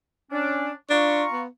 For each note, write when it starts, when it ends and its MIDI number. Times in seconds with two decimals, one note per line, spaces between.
0.31 0.70 61
0.31 0.70 62
0.90 1.24 62
0.90 1.40 65
0.90 1.40 82
0.90 1.40 85
1.31 1.48 59